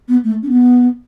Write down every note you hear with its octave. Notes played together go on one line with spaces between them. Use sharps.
B3
A3
C#4
B3